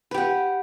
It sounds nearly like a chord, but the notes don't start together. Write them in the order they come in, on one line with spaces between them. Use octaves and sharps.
B4 G4 F#5